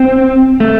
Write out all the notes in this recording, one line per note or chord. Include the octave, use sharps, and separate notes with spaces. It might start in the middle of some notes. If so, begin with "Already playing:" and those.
Already playing: C4
A3